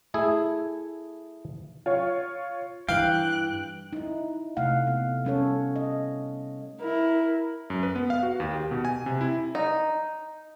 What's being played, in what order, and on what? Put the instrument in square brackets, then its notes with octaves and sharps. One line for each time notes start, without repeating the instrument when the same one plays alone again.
[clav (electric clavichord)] A3 E4 G#4
[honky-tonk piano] F4 C#5
[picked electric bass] G2 E3 [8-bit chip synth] F5 [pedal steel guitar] G5 [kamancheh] F#6
[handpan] D#4 E4
C3 A3 F5 F#5
A3 B3
G3 C#4 A4 C#5
D#5
[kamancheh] E4 A#4
[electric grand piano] F#2
B4
B3
F5
F#4
D#2
G4
B2
G#5
C3
E4
[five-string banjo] D#4